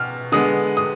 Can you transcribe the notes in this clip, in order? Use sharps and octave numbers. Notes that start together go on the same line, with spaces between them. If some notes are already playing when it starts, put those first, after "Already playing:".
Already playing: B2 B3 F6
D3 G#3 B3 D#6
D#6